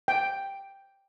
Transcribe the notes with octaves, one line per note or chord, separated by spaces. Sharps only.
G5